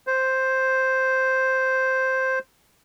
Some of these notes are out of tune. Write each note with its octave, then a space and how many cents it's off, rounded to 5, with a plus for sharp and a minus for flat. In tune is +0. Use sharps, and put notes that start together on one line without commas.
C5 +0